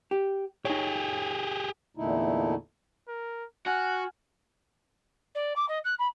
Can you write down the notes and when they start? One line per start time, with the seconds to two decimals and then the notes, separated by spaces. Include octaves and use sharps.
0.11 G4
0.65 D#4 G4 G#4 C#5
1.97 E2 A#2 D3 A3 D#4 E4
3.08 A#4
3.66 F#4 F#5 G#5 F6 F#6
5.35 D5
5.56 D6
5.69 D#5
5.85 F#6
5.99 B5